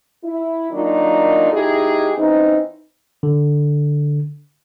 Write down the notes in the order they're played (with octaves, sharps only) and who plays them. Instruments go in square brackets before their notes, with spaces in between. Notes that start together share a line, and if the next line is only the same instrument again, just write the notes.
[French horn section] E4
D#3 F#3 A#3 D4 D#4 F4
G#3 D#4 E4 G4 G#4
E3 C4 C#4 D#4
[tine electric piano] D3